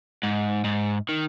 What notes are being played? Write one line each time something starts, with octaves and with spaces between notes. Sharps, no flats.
G#2
G#2
D#3